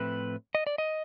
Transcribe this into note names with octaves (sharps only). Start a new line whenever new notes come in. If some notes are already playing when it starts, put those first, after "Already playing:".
Already playing: A2 F3 A3 C4 B4
D#5
D5
D#5